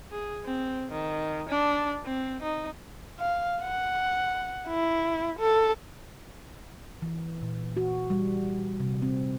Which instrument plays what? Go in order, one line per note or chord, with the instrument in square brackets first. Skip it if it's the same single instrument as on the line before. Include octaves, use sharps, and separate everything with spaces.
[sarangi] G#4
C4
D#3
D4
C4
D#4
[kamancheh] F5
F#5
E4
A4
[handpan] E3
A#2
F#4
G3
C3
C4